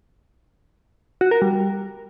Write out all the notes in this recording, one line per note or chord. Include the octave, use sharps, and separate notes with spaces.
F#4
A#4
G3